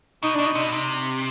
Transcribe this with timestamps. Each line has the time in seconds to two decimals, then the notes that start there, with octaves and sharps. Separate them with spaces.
0.23 B2 D#4
0.35 B2 D4
0.46 D#4
0.55 C3
0.63 B2
0.72 C3